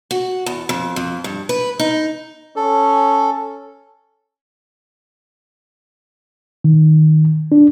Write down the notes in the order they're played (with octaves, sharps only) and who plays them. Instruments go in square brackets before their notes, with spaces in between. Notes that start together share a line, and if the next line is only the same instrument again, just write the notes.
[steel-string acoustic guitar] F#4
E2
F2
F2
G2
B4
D#4
[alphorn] C#4 [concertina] A4
[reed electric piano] D#3
D4